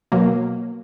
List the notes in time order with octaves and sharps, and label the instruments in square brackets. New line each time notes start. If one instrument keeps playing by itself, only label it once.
[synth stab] B2 F#3 A#3